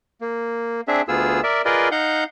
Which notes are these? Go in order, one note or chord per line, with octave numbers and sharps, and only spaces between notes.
A#3
C4 D4 G#4 E5
D2 B3 F4 G#4 E6
A#4 D5 E5
F4 G#4 A#4 B4 D5 D#5
D#4 F5 F#5 G6